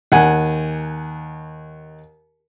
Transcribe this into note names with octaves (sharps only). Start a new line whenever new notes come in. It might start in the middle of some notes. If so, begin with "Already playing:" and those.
D#2 F#5 G#5